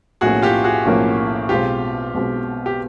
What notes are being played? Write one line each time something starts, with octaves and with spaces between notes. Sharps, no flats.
B1 A2 F3 A#3 C#4 F#4 G#4
F4 G4
F#4 G#4
B1 A2 F3 A#3 C#4
B1 B2 G#3 C4 F4 G4
B1 B2 G#3 C4
G4